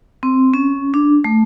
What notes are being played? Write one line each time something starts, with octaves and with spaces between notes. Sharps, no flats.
C4
C#4
D4
A3